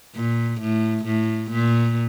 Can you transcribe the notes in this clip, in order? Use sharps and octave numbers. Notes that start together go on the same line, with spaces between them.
A#2
A2
A2
A#2